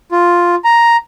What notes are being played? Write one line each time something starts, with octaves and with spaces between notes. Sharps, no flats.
F4
A#5